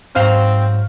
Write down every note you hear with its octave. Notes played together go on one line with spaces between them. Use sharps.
G#2 F#3 C4 C5 F5 F6